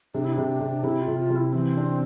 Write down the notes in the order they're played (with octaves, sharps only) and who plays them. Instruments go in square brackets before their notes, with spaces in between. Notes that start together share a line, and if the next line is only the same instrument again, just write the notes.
[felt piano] C3 [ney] D4
[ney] E4
[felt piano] C3 [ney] D4
[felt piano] C3
[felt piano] C3 [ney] E4
[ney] F4
[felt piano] C3
[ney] F4
[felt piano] C3
[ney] E4
[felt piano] E3 [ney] C4
[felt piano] D4